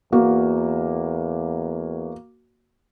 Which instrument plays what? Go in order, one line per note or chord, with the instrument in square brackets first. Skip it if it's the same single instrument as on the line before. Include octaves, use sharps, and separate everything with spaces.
[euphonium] E2 [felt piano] A#3 F#4